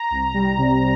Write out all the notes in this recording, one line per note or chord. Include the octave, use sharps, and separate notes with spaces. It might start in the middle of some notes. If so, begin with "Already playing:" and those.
Already playing: A#5
C2
G3
C3